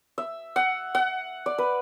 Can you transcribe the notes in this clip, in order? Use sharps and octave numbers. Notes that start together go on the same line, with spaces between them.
E5
F#5
F#5
D5
B4